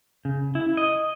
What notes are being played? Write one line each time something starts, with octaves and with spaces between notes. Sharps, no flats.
C#3
E4
D#5